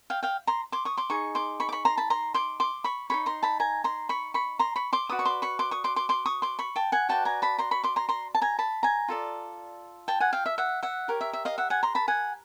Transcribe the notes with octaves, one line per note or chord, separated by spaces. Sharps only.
F5 G5
F5 G5
A#5 C6
C6 D6
C#6 D#6
C6 D6
D#4 G#4 C#6
C6 D6
B5 C#6
D6
B5 C#6
A#5 C6
A5 B5
A#5 C6
C6 D6
C6 D6
B5 C#6
D#4 G#4 C#5 B5 C#6
A#5 C6
A5 B5
G#5 A#5
A#5 C6
B5 C#6
B5 C#6
A#5 C6
B5 C#6
C6 D6
F#4 B4 D5 D#6
C#6
C6 D6
B5 C#6
C6 D6
C#6 D#6
C6 D6
C6 D6
C6 D6
C#6 D#6
C6 D6
B5 C#6
G5 A5
F#5 G#5
F#4 B4 D5 G5 A5
G#5 A#5
A5 B5
A#5 C6
B5 C#6
C6 D6
A#5 C6
A#5 C6
A5
G#5 A#5
A5 B5
G#5 A#5
F4 A4 D5
G5 A5
F#5 G#5
F5 G5
E5
E5 F#5
E5 F#5
G4 A#4 C#5
E5
E5
D#5 F5
E5 F#5
F#5 G#5
A#5 C6
A5 B5
F#5 G#5